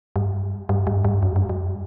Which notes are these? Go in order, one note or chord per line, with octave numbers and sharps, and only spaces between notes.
G2
G2
G2
G2
F#2
G2
F#2